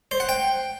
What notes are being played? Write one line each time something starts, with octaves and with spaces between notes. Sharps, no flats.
C5
F#5
G5